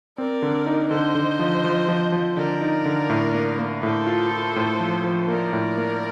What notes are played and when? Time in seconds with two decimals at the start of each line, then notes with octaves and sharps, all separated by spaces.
0.18 C4 A#4 D5
0.42 D3
0.66 D#4
0.90 D3 C5 D#5
1.15 D3
1.39 F3
1.64 F3
1.89 F3
2.12 F3
2.36 D3 A#4 D5
2.61 D#4
2.86 D3
3.10 A2
3.34 A#3
3.59 A#3
3.83 A2 A4 C5
4.07 F4
4.31 F4
4.56 A2
4.80 F3
5.04 F3
5.28 A#3 A#4 D5
5.53 A2
5.78 A#3